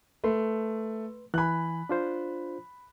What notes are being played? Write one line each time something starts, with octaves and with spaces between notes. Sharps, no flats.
A3 B4 C6
E3 G#5 B5 F#6
D4 F4 C5